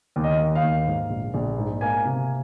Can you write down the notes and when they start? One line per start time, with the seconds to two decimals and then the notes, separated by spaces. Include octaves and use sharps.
0.16 D#2
0.24 D#5
0.39 D#2
0.55 F5
0.63 D#2
0.87 G#2
1.10 A#1
1.34 A#1
1.58 G#2
1.81 A#3 G#5
2.05 C3